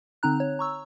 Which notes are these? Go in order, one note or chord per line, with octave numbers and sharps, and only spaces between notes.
D3 C4 D#4 A#5 F#6
C#5
A#5 C#6 E6